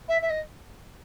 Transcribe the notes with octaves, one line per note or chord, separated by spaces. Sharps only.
E5
E5
D#5